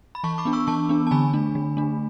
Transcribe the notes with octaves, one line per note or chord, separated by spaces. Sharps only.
B5
E3 A5 C#6
B5 D6
B3 D4
C#6 E6
E3 A5 C#6
B3 D4
A5
D3 G#5 B5
A3 D4
D3
A3 D4